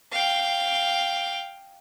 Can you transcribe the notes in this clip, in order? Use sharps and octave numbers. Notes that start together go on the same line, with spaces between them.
F5 G5